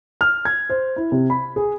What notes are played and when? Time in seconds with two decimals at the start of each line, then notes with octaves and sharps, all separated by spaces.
0.21 F6
0.45 G#6
0.70 C5
0.96 E4
1.12 C3
1.30 B5
1.56 G#4